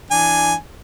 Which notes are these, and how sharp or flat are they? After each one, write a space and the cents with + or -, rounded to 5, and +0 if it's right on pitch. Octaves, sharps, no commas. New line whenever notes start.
E3 +0 D4 +0 G#5 +0